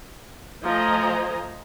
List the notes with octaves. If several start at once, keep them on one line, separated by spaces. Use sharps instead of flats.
F3 A3 C5 D#5 G#5 A#5